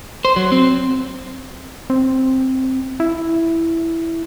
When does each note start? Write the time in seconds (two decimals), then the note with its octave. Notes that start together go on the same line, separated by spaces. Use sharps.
0.25 C5
0.36 F#3
0.52 C4
1.90 C4
3.00 E4